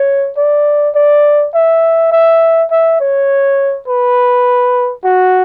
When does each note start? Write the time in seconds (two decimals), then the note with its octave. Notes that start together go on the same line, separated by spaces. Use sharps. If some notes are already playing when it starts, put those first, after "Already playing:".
Already playing: C#5
0.37 D5
0.95 D5
1.54 E5
2.12 E5
2.71 E5
3.00 C#5
3.88 B4
5.04 F#4